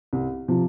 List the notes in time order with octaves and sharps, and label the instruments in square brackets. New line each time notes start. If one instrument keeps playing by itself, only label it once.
[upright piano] C2
C3 F3